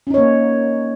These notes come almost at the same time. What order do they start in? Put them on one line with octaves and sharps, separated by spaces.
C#4 D#4 C#5 A#3